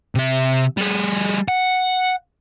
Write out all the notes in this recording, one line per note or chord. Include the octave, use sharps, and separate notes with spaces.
C3 E5
G3 G#4
F#5